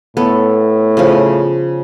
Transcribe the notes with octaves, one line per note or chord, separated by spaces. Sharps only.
A2 B3 A4
C#3 F3